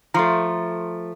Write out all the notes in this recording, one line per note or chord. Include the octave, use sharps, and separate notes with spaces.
F3 A3 A#5 C6